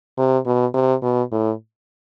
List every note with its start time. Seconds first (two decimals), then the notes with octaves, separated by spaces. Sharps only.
0.18 C3
0.46 B2
0.74 C3
1.02 B2
1.32 A2